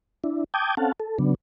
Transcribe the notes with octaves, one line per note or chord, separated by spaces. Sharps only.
D4 E4
G5 A5 D6 D#6 G6 G#6
C4 C#4 A4 F5 F#5 A5
A4
C#3 F#3 B3 D4